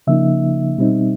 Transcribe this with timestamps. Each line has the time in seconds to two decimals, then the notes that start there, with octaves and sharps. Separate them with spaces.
0.07 C#3 F3 A#3 D#4 E5
0.78 B2 G3 C4 D#4